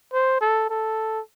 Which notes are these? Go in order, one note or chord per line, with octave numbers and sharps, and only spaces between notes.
C5
A4
A4